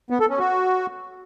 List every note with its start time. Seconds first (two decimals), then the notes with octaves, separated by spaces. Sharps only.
0.10 B3
0.20 A4
0.30 C#4
0.39 F#4